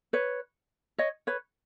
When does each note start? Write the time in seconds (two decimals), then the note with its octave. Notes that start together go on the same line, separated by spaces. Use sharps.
0.13 B4 C#5
0.98 C#5 D#5
1.27 B4 C#5